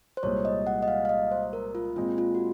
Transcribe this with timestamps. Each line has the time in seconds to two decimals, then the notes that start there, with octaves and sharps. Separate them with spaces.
0.17 C5
0.23 C2 A#2 G#3 C#5
0.45 D#5
0.67 F#5
0.82 D#5
0.88 F5
1.05 F5
1.09 D#5
1.31 C5
1.53 A#4
1.75 F4
1.96 A#2 G#3 C4 F4
2.18 F4
2.35 F#4